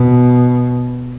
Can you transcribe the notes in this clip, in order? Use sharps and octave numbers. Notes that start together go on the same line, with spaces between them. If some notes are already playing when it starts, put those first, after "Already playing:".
Already playing: B2